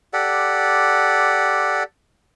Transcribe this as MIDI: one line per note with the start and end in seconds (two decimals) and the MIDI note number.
0.13 1.83 67
0.13 1.83 69
0.13 1.83 74
0.13 1.83 78